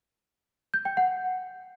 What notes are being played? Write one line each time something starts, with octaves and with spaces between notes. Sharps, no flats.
G6
G5
F#5